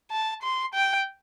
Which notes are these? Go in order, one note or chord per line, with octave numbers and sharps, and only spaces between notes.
A5
C6
G5